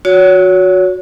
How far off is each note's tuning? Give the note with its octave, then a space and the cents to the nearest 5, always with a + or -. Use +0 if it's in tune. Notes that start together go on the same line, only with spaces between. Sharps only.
F#4 -20 C#5 +25